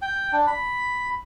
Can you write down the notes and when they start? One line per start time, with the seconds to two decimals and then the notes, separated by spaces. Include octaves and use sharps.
0.02 G5
0.32 D4
0.47 B5